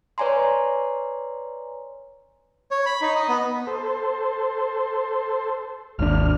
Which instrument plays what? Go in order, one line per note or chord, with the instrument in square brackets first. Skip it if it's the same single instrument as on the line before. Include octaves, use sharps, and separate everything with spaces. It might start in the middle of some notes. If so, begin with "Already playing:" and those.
[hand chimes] B4 C#5 D5 G#5 A#5 C6
[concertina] C#5
B5
D#4
D#5
B3
[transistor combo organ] A4 C5
[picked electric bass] G#1 D#2 D4 [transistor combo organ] F6